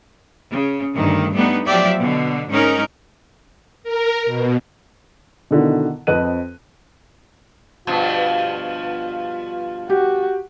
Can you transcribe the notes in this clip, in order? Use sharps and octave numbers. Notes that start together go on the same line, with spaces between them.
C#3
D2 G2 D#3
G3 A3 B3 D4 D#4
F3 F#3 G4 D5 E5
B2 D3
G#2 C#4 D#4 A#4
A#4
B2
B2 D3 D#3 E4
F2 C4 B4 D#5 F#6 D#7
G2 B2 F3 F4
F#4 G4